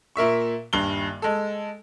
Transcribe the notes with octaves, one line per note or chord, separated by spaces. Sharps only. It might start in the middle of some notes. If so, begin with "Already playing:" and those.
A#2 A#4 E5 C#6
D#1 G2 G7
G#3 A4